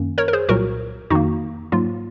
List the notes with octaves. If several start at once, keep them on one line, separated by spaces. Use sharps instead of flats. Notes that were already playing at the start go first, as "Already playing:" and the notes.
Already playing: F#2 D#3 A#3 C#4
A#4 C#5
A#4
G#4 C5
C2 A#2 F#3 F#4 A#4
F2 D#3 A#3 D#4 F#4
G#2 F#3 A#3 F4